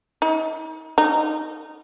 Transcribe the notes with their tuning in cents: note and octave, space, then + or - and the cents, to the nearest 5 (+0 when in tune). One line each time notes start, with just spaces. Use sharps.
D#4 +35
D#4 -5